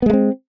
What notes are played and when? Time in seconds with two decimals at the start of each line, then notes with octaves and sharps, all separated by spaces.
0.02 B3
0.06 G#3
0.10 A3
0.13 C4